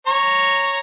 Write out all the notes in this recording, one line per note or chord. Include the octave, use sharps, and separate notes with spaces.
C#5 A#5 C#6